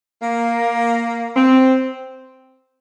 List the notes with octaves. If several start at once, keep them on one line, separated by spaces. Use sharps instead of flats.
A#3
C4